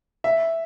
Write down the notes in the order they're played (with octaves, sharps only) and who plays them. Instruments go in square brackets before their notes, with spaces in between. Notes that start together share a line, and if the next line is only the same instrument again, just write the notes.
[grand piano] E5